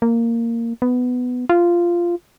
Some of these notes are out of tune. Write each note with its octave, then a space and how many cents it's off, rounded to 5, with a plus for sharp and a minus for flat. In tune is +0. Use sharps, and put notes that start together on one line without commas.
A#3 -10
B3 +10
F4 -10